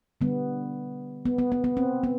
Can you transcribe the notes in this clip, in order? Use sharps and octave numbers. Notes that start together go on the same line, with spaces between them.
D3 G3 B3
B3
B3
B3
B3
C4
B3